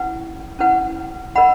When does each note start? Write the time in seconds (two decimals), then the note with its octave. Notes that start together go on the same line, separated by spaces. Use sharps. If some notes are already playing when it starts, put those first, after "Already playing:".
Already playing: C#4 E4 B4 F#5
0.59 C#4 E4 B4 F#5
1.35 A#4 D#5 F#5 B5